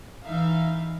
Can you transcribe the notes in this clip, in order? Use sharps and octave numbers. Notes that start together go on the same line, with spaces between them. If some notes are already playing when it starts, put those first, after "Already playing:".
E3 D#4 E5 F5